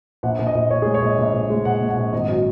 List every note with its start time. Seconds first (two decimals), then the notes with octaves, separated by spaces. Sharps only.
0.23 A#1 F#5
0.39 A#1
0.47 D#5
0.55 A#1
0.70 A#1 C#5
0.82 G#3 G#4
0.94 C#5
1.02 A#1 D#5
1.18 A#1
1.33 A#1
1.50 G#3
1.65 A#1 F#5
1.81 A#2
1.89 F#5
1.97 A#1
2.13 G#1 D#5
2.28 F#3